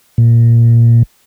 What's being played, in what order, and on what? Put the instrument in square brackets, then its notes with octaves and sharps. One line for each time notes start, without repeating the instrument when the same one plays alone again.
[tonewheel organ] A#2